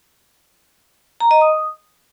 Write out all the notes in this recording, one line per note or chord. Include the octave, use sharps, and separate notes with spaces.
A#5
D#5
D#6